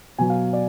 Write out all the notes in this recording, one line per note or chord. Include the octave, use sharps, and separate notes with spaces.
B2 F#3 G#5
F5
D5